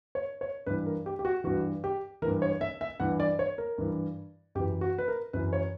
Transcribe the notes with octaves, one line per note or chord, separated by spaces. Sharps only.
C#5
C#5
G2 E3 B4
A#4
G4
G4
F#4
G2 E3 F#4
G4
E3 A#4
G2
C#5
E5
E5
G2 E3 F#5
D5
C#5
A#4
G2 E3
F#2 E3 G4
F#4
B4
A#4
F#2 E3 B4
C#5